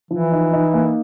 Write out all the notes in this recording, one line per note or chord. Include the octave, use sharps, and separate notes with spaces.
E3 F3
D#4
D#4
A#3